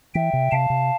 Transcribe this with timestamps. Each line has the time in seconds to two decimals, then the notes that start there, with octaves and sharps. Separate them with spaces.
0.14 E3 E5 G5
0.33 C3
0.52 C3 F5 A5
0.70 C3